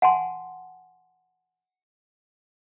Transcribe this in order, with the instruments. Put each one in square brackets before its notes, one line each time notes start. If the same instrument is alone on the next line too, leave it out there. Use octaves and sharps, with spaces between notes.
[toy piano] F#5 G#5 A5 C6